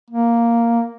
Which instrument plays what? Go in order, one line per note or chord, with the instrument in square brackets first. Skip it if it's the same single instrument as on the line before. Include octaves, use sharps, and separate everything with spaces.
[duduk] A#3